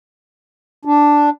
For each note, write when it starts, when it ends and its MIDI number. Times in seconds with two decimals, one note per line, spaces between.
0.85 1.30 62